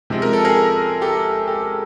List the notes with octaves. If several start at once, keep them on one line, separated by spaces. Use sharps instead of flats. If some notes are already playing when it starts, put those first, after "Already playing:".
C3 F3 G#3
A#4
A4
G#4 A#4
G4 A4
G4 A4